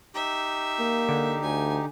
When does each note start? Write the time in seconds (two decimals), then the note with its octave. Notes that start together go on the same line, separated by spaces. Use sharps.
0.14 D#4 G4 E5
0.79 A#3
1.09 D3
1.43 D2 G#5